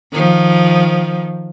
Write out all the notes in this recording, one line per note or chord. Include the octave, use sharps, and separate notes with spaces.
D#3 F3